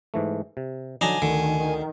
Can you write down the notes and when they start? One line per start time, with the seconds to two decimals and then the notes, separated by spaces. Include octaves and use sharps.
0.14 G#2 E3 A3
0.57 C3
1.01 D3 F#3 D4 D#4 G#5 A#5
1.22 D2 D3 D#3
1.60 D#3